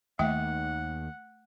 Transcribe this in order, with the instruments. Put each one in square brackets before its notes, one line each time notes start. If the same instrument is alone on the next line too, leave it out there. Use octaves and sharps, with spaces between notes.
[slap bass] D#2 D#3 [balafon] A3 E5 G5 [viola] F#5